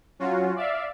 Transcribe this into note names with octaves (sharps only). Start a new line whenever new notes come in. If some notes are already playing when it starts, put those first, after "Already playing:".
F#3 C#4 F4 F#4
D5 E5 F5